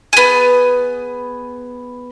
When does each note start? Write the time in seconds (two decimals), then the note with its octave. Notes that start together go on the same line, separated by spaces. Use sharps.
0.13 B3 G#4